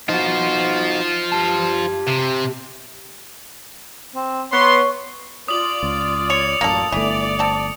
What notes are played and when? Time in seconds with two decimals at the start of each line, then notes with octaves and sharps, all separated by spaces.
0.09 D#4 F4 F#4 C5
1.32 G4 A5
2.08 C3
4.15 C4
4.52 B3 C#5 C6
5.48 F4 D5 D#6 F#7
5.83 C#2
6.30 C#5 C#7 F7
6.61 A1 F#2 A#3 A4
6.92 G1 E3 A3 D5
7.39 C4 A4